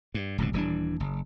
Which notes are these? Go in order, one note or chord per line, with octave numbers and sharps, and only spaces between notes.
G2
D1 C#2 G#2
D#1 E3 G3 D4
F#1